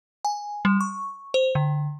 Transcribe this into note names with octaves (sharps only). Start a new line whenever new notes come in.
G#5
G3
C#6
C5
D3